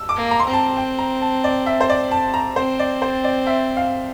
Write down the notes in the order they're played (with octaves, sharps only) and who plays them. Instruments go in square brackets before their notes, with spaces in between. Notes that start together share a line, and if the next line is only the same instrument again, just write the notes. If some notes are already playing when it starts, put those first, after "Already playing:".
Already playing: [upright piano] E6
D6
[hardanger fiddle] A#3
[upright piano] A#5
C6
[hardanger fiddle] C4 [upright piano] A#5
[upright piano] A5
G5
A#5
A5
D5
E5
C5
D5
A5
A#5
[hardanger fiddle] C4 [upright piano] C5
[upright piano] D5
C5
D5
E5
F5